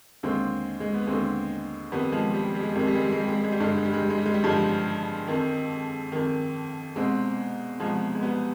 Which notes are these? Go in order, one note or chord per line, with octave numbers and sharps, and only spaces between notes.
D#2 D3 G#3 C4
G#3
B3
D#2 D3 G#3 C4
F2 D#3 G3 B3
F3 G#3
G3
G3
G#3
G3
F2 D#3 G#3
G3
G#3
G3
G#3
G3
G#3
G3
G#3
G3
G2 D3 G#3
G3
G#3
G3
G#3
G3
G#3
G3
G#3
G3
G2 D3 F3 G#3
F2 D#3
F2 D#3
C2 B2 G#3 C4
C2 B2 F3 G#3
G#3
G3 B3